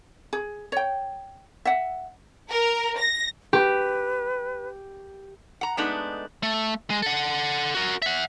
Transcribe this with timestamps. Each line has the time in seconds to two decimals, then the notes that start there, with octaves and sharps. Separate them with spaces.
0.33 G#4
0.72 C#5 G5
1.65 E5 F#5
2.51 A#4
2.99 A#6
3.53 G4 B4
5.61 F#5 A#5
5.77 G#3 A3 B3 D4 D#4
6.43 A3
6.90 G#3
7.02 A4 F#5
7.75 F#4 A#4
8.02 E5 F#5